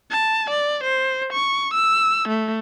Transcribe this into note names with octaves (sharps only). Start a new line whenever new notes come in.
A5
D5
C5
C#6
E6
A3